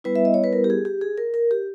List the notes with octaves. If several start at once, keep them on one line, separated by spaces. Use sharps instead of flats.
G3 B3 E4 B4
E5
D#5
C#5
B4
A#4
G4
G#4
G4
G#4
A#4
A#4
G4